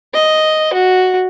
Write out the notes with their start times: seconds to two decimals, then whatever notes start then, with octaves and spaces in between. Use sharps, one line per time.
0.14 D#5
0.73 F#4